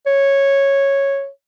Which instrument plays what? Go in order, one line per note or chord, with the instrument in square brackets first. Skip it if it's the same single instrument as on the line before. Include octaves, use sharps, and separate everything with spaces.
[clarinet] C#5